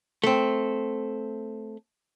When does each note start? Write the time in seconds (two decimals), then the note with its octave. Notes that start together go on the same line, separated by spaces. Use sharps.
0.24 A3 C4